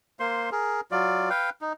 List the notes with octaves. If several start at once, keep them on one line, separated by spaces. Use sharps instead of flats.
A#3 C5 C6
G#4 A#4
F#3 F4 D5
B4 F5 G5
D#4